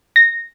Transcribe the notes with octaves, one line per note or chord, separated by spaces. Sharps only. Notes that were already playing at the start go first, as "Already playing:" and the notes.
A#6